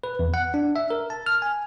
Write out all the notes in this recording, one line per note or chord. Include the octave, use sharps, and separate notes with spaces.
B4
E2
F#5
D4
E5
A#4
A5
F6
G#5